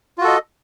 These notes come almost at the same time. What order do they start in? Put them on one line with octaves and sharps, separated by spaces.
F4 F#4 A4 D#5